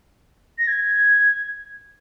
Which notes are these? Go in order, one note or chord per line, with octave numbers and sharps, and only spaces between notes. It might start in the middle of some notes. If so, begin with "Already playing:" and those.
A#6
G#6